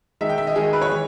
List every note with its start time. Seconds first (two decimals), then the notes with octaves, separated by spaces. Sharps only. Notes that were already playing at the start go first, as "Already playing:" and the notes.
0.21 D#3 G#3 D#4 E5
0.29 G5
0.38 E5
0.47 D#5
0.55 D#3 G#3 D#4 G#4
0.73 B4
0.82 C#5
0.90 E3 G#3